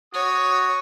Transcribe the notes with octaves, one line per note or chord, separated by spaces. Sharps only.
F#4 C#5 D#6